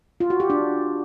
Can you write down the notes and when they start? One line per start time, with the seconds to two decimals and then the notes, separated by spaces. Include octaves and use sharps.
0.20 F4
0.30 F#4
0.40 G4
0.50 D4